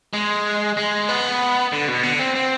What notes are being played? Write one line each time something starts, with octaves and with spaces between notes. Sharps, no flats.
G#3
G#3
B3
D3
B2
D3
C4
C4